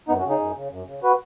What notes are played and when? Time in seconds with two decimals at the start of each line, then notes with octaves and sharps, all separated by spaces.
0.08 F#2 B3 D#4
0.19 C#4 F#4
0.24 C#3
0.30 D#4 G#4
0.40 F#2
0.56 C#3
0.71 F#2
0.87 C#3
1.03 F#4 B4